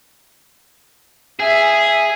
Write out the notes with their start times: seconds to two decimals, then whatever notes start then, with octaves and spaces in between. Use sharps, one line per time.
1.40 G#4 E5 G#5